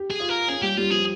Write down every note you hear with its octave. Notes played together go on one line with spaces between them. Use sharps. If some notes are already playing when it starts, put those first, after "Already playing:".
Already playing: G4
G#4
F4
A#4
C#4 G#4
G3 G4
G3 F4
F3 G#4